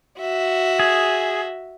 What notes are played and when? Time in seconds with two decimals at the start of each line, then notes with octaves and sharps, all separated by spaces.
0.20 F#4 E5
0.79 G#4